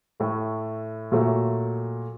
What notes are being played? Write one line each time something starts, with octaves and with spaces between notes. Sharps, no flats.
A2 A3
A#2 F#3 A3